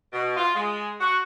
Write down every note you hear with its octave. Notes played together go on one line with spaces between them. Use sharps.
B2
F4
G#3
F#4